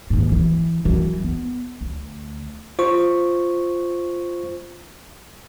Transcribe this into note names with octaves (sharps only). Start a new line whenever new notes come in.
D#2 G#2
E3
F#2 E3
B3
D2
F4 C5 C#6